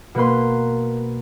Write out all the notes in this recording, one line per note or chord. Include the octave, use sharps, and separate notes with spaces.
B2 A#3 B4 C6